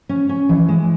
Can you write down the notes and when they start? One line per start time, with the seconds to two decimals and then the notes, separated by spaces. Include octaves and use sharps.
0.09 C#4
0.29 C#4
0.49 E3
0.69 G#3